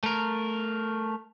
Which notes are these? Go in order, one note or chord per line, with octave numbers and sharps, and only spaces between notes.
A3 A#4